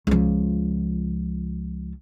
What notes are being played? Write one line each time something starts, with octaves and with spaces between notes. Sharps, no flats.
C#2 F3